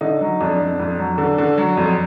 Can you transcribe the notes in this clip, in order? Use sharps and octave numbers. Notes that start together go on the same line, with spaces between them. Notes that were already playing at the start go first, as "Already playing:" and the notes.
D3 D#4
F#3
F2 D4
F2
F2
F#3
D3
D3
F#3
F2